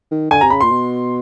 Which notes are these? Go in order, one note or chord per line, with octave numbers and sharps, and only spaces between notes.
D#3
D3 G#5
C3 A#5
C#3 B5
A#2 C6
B2